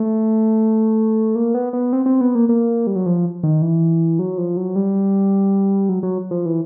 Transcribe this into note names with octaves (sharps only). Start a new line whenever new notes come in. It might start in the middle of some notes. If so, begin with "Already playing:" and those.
Already playing: A3
A#3
B3
B3
C4
C4
B3
A#3
A#3
G3
F#3
F3
D#3
E3
F#3
F3
F#3
G3
F#3
F#3
F3
E3